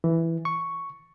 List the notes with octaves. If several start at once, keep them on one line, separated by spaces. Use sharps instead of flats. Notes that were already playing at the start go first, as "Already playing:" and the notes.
E3
C#6